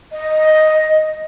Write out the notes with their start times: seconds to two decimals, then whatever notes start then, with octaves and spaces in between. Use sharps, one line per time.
0.12 D#5